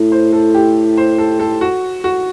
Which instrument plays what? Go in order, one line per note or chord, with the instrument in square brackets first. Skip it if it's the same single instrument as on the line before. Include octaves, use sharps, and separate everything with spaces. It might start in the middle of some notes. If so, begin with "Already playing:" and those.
Already playing: [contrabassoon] A2
[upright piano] C5
A4
G4
C5
A4
A4
F#4
F#4